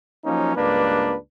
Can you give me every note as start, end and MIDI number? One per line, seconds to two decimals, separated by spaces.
0.25 0.55 53
0.25 0.55 54
0.25 0.55 58
0.25 0.55 61
0.25 0.55 63
0.55 1.14 37
0.55 1.14 43
0.55 1.14 58
0.55 1.14 62
0.55 1.14 71